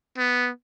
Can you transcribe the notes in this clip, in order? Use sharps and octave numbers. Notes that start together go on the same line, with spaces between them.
B3